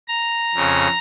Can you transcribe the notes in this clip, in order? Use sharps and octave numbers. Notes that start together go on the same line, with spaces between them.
A#5
F2 C#3